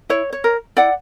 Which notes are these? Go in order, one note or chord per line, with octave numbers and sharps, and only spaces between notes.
E4 C#5
C#5
A#4
E4 D5 F#5